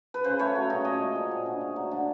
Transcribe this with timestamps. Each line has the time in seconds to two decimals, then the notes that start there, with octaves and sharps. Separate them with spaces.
0.14 B4
0.24 C#3 C5
0.39 A3 C#5
0.56 F#3
0.70 C#3 D#5
0.85 A#2 D#5
1.01 G#3
1.15 F3
1.31 A#2
1.46 D3
1.61 A3
1.76 F#3
1.91 D3